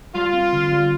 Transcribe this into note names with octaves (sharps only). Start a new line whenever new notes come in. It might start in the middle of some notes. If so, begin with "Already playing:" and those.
G3 F4
C4
D3
G3